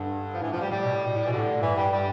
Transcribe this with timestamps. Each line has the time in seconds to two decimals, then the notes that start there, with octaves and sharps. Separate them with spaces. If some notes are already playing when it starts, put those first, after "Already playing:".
Already playing: G2 D3
0.33 F3
0.41 A2 E3
0.51 F3
0.56 A2 G3
0.71 A2 G3
0.83 B2
0.94 A2
1.05 B2
1.16 A2
1.25 E3
1.28 B2 D3
1.38 A2
1.61 G2 E3
1.76 G3
1.91 G3